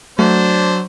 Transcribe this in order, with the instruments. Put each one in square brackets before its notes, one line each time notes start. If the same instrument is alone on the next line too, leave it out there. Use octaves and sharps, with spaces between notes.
[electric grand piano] F#3 [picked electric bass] A3 [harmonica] D4 C5